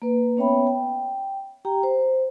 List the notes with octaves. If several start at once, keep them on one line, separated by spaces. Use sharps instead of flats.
A#3 B4
B3 C#4 C#5 E5 G5 B5
G5
G4 G5 A#5
C5